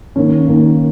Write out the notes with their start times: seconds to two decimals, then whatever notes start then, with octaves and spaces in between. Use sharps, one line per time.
0.16 D#3 A#3 C#4
0.48 D#3 A#3